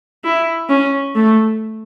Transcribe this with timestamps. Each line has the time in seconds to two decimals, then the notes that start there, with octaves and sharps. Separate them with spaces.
0.24 E4
0.69 C#4
1.15 A3